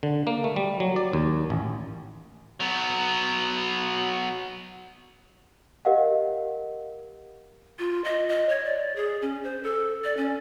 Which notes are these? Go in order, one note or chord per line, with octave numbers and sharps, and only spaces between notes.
D3
A#3
A3
G3
F#3
D5
D#2
A1
F#3 B3
G4 A#4 D#5 F5 F#5
F4
D#5
D#5
C#5
D5
G#4
C#4
C5
A4
D5
C#4